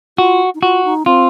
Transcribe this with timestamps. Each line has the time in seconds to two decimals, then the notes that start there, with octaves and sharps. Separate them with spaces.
0.18 F4 F#4
0.55 D#4
0.62 F4 F#4
0.85 D#4
1.06 C4 F4